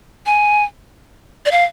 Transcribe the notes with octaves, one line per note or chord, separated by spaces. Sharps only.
G#5
D5
F5